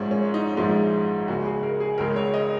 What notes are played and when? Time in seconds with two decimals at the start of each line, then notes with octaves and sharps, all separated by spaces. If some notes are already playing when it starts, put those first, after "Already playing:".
Already playing: A#1 G#2 F3 G#3 C#4
0.11 C#4
0.34 D#4
0.57 A#1 G#2 F3 G#3 D#4
1.28 C#2 C#3 G#3 F#4
1.45 G#4
1.63 A#4
1.80 G#4
1.98 C#2 C#3 G#3 A#4
2.16 C#5
2.34 D#5